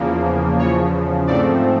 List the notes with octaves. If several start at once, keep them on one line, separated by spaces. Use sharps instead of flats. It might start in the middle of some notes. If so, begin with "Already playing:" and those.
Already playing: E2 C#3 F3 A#3
E2 C#3 F3 C#5
G#2 F3 A3 C4 D5